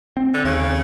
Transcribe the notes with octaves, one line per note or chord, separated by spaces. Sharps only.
C4
D3
D#2 C#3